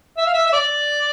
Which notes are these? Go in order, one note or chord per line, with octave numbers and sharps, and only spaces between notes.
E5
F5
E5
E5
D5